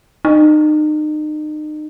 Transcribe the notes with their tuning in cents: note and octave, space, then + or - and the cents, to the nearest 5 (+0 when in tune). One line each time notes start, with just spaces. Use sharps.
D#4 -35